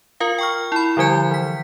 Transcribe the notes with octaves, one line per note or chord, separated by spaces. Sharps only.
F4 A#4 F5
G5 C#6 F6
E4 B5
D3 F3 G3 G#5 G6
E3 B6